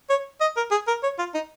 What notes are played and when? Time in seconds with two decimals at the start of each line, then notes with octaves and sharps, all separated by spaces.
0.10 C#5
0.41 D#5
0.56 A#4
0.71 G#4
0.88 A#4
1.03 C#5
1.19 F4
1.34 D#4